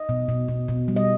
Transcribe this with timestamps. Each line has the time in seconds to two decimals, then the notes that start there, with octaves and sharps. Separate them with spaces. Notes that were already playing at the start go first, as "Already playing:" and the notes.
Already playing: D#5
0.09 B2
0.29 B2
0.48 B2
0.68 B2
0.88 G3
0.96 D#5